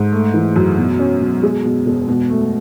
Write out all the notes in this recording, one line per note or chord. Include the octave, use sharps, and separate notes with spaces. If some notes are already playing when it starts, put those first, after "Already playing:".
Already playing: G#2
A3
E3
F#2
B2
C#4
B2
G#3
B2
E1
B2
A3